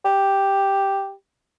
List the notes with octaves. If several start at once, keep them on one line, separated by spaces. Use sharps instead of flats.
G4